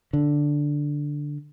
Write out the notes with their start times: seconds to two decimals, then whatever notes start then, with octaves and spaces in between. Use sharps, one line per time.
0.13 D3